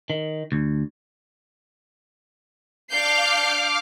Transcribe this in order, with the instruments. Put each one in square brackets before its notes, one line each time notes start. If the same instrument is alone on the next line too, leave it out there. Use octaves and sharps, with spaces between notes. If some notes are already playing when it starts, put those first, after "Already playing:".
[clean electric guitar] D#3
D2
[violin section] D4 G6 C7 [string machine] F5 D6 F6